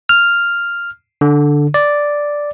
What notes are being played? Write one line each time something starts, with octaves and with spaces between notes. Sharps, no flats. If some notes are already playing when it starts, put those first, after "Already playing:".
F6
D3
D5